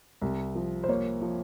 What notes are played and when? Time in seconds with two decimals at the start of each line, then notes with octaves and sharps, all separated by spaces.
0.22 C2
0.55 F3
0.84 C5
0.88 A#3 C#5
1.22 F3